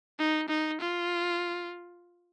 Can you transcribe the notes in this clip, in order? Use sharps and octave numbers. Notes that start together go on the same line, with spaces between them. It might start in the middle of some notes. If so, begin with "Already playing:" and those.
D#4
D#4
F4